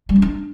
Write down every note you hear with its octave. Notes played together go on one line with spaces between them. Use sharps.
G3
C#4
D4